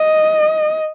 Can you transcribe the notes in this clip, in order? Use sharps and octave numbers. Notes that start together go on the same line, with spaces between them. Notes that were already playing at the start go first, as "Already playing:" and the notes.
Already playing: D#5